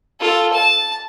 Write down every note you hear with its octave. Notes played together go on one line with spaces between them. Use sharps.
F4 A4
A5